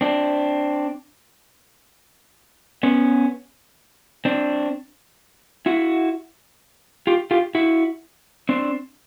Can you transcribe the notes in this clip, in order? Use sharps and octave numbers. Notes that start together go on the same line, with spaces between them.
C4 D4
B3 C#4
C4 D4
E4 F#4
F4 G4
F4 G4
E4 F#4
C4 D4